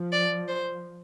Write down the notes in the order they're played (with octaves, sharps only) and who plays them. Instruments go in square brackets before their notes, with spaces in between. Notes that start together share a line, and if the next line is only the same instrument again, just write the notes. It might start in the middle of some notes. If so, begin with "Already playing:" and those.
Already playing: [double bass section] F3
[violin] D5
C5